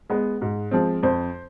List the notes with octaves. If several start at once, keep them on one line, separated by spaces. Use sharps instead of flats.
G#3 B3
G#2
F3 G#3 C4
F2 C5